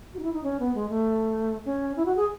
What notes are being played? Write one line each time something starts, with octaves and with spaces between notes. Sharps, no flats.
F#4
D#4
E4
D#4
C#4
B3
G#3
A3
C#4
E4
F#4
G#4